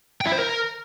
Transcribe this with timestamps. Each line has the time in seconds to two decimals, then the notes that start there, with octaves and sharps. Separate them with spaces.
0.21 G5
0.27 E4
0.32 C5
0.38 A#4